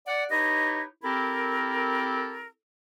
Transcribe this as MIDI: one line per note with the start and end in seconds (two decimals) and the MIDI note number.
0.07 0.25 74
0.07 0.25 78
0.30 0.82 63
0.30 0.82 64
0.30 0.82 67
0.30 0.82 71
0.30 0.82 73
0.30 0.82 75
1.03 2.49 60
1.03 2.49 64
1.03 2.49 67
1.03 2.49 69
1.03 2.49 70